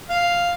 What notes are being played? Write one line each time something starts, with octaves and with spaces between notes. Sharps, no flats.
F5